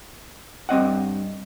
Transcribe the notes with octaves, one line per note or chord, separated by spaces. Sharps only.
G2 C4 D#5 F#5